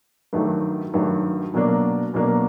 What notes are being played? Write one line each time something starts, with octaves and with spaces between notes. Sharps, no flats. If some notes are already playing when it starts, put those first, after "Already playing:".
G2 D#3 F#3 A3
G2 D#3 F#3 A3
B2 F#3 A#3 D4
B2 F#3 A#3 D4